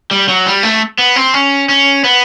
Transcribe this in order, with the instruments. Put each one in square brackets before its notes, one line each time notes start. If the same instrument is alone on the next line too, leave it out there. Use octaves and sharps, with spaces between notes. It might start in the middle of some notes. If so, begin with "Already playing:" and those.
[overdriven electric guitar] G3
F#3
G3
A3
B3
C4
C#4
C#4
B3